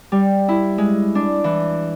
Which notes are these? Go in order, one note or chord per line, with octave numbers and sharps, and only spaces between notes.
G3
E4
G#3
D4
E3